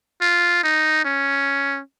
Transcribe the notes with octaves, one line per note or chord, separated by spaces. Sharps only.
F4
D#4
C#4